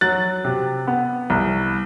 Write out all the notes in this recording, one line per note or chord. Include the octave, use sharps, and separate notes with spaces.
F#3 F#6 A6
C3
B3
C2